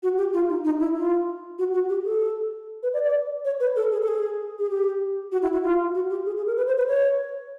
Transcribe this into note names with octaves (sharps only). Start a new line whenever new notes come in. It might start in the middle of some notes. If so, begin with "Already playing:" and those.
F#4
G4
F4
D#4
D#4
E4
F4
F#4
F#4
G4
A4
B4
D5
D5
C#5
B4
A4
G#4
A4
G#4
G#4
G4
F#4
E4
F#4
F4
F#4
G4
G#4
G#4
A#4
B4
C5
B4
C#5